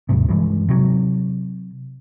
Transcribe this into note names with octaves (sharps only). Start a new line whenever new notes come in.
D#2 G#2 C3
G2 E3 F#3 G#3
C3 F#3